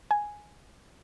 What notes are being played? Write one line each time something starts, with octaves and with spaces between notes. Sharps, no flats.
G#5